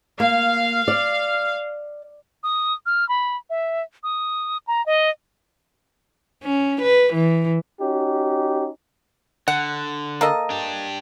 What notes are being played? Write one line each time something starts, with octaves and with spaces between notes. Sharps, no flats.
A#3 F5
D5
D#6
F6
B5
E5
D#6
A#5
D#5
C#4
B4
E3
C#4 D#4 F#4 G4
D3 F#5
A#3 A4 D#5
D4 G4